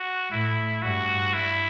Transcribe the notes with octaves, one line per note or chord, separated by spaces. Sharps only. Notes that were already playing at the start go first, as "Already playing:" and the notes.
Already playing: F#4
A2 E4
G2 F#4
G2 E4